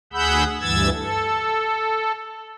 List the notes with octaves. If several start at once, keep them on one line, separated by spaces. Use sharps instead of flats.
D2 G#4 F#5 B5 E6 G6
D2 G2 E3 E6 G#6 A6
A4